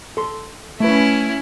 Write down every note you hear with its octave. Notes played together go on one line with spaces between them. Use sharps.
A4 C6
A3 C#4 E4 B4